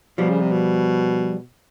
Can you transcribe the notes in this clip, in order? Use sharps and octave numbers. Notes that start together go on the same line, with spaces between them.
B2 F3 G3
C#3
C3
B2